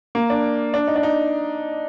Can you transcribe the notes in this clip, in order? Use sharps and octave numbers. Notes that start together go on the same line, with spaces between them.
A#3
D4
D4
D#4
D4
D#4